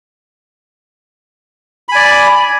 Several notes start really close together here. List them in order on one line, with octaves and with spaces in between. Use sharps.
B5 G#5 D5